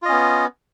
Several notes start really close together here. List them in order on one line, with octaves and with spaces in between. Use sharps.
F4 D#5 C#4 B3